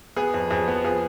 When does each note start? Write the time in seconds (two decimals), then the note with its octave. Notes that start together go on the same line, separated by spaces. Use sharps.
0.16 B3 G#4
0.34 F2
0.51 F2 G#4
0.68 B3
0.84 F3 G#4